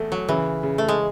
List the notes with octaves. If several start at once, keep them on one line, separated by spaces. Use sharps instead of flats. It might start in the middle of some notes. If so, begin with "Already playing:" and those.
Already playing: E2 A3
F#3
C#3 E3
C#3
A3
G#3